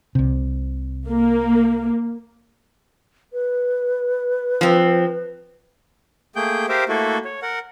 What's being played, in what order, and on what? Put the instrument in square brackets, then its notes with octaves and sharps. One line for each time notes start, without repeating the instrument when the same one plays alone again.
[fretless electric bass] C2 C3
[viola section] A#3
[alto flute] B4
[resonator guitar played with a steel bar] F3 C4
[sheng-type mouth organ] A3 A#3 G#4 G5 G6
G4 A#4 C5 E5 F5 G5
A3 A#3 E4 F#4 A4
C#5
A#4 F#5